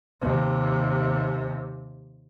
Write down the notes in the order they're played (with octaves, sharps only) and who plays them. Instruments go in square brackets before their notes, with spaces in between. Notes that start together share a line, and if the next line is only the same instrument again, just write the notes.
[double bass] D#2 C3